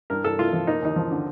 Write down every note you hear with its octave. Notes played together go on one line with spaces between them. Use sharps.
G2 A#4
G2 A4
A3 F4
F3
A#3 D#4
D#2 D#4
F3
D3